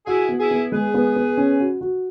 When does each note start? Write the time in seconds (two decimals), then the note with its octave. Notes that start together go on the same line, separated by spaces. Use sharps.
0.06 E4 F#4 G#4
0.29 B3
0.39 E4 G#4
0.51 B3
0.72 G#3 G#4 B4
0.94 B3
1.16 B3
1.37 C#4
1.60 F#4
1.81 F#4